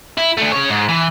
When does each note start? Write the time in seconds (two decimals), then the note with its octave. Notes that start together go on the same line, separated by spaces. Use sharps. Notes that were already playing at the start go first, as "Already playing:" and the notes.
0.18 E4
0.37 A3 D4
0.52 C#3 C#5
0.70 G#2
0.89 E3